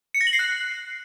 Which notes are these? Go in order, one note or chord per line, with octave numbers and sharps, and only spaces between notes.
C#7
A#6
F#7
C7
F#6